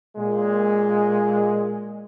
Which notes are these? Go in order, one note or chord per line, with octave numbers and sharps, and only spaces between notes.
A#2 G#3